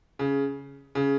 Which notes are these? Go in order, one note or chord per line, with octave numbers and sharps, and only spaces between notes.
C#3
C#3